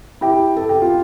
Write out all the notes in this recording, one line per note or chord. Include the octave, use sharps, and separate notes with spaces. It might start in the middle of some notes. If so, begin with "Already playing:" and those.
E4 G4
A4
G4
F4